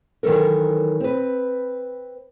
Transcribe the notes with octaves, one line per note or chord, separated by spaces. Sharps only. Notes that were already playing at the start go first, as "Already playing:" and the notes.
D#3 E3 F#3 A4 A#4
C4 B4